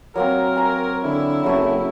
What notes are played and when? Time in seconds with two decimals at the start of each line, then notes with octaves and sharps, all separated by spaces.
0.16 F#3 A#3 C4 A#4
0.56 G#5 A#5
1.05 D3 E4
1.44 F#1 F#3 A3 E5